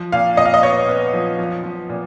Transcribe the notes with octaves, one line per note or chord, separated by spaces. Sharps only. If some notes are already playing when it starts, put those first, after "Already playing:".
Already playing: F3
A#2 F5
A#2 D#5
F5
D#5
B3 C#5
B3
F3
F3
F3
A#2